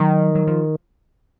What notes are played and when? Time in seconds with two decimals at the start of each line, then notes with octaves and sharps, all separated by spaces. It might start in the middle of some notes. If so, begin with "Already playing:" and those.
Already playing: D#3 F#3
0.35 F#3
0.47 F3